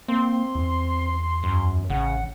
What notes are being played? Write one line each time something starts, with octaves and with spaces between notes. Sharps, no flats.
A#3 C4 C6
E2
F#2
A1 C#3 F#5